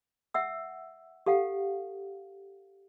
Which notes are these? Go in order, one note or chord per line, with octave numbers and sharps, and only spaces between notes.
E5 F#5 E6
G4 A4 F5 F#5